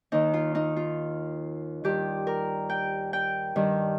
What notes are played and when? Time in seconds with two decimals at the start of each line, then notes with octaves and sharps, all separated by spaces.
0.12 D#2 D#3 D#4
0.34 F4
0.55 D#4
0.76 F4
1.84 G2 D#3 G4
2.27 A#4
2.70 G5
3.13 G5
3.56 G2 D#3